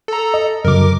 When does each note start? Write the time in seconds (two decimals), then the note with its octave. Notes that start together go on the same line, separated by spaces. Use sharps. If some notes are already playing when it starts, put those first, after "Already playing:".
0.08 A4 A#5
0.34 D#5
0.65 F#2 C#3 F#3 A#4 D6